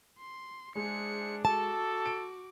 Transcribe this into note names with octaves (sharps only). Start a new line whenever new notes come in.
C6
G#3 D4 E4 G#4 C5 C#7
F#4 A4 A5 D6
D7